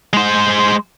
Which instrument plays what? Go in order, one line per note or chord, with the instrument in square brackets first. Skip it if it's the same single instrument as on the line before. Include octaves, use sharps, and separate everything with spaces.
[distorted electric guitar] G#3 C5